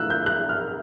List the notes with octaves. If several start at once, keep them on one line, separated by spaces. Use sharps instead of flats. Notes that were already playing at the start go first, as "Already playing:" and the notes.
Already playing: A2 E3 A3 D4 F4 E6 F#6
G6
F#6
F6